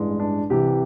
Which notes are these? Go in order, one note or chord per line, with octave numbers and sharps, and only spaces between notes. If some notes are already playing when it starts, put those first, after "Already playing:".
Already playing: A1 G2 E3 G#3
D4
C2 C3 E3 G4